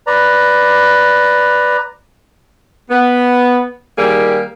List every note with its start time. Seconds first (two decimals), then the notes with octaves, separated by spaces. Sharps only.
0.07 B4 D5 A#5
2.90 B3
3.98 D#3 G3 A#3 G4 G#4